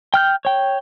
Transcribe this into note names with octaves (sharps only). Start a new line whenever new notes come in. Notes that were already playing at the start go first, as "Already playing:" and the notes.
G5 F6 G6
C#5 G5